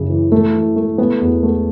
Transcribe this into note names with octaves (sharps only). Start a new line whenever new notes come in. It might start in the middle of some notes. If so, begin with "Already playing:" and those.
Already playing: F#2 C#3
E3
E3 A3
E3
A3
A3 B3
E2
A3